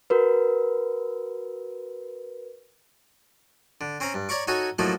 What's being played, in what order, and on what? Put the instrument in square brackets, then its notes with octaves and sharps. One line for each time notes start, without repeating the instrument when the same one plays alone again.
[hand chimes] F#4 A#4 B4
[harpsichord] D3
C4 C#4 C5 A#5 B5
G2
C#5 D5 A#5 B5 C#6 D6
D#4 F#4 A4 C#5 G#5
F3 F#3 A3 A#3 D#4 E4